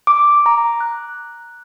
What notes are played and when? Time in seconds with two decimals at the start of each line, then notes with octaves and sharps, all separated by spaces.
0.07 D6
0.46 A#5
0.81 F#6